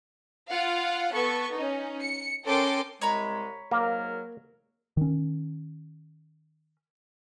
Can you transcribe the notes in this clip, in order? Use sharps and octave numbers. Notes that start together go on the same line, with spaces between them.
F4 F5 F#5
B3 A4 C#6
C#4 D#4
C#7
C#4 A4 A#4 G5 C6 D6
C2 G#3 C#5 A#5 B5
G#2 F#3 A#3 A#4
D#3 C#4